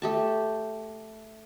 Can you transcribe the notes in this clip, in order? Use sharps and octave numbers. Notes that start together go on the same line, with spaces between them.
A3 G4 A5